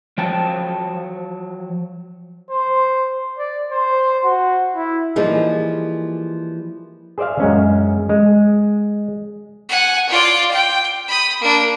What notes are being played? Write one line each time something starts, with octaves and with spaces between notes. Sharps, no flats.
F3 F#3 G5 A5
C5
D5
C5
F#4
E4
E3 F3 G3 A#3 D#4 G#4
G#4 C5 D5 E5 F5
F#2 G#3 C#4
G#3
F#5 G#5
F4 D5
G5
B5 D#6
A#3 D4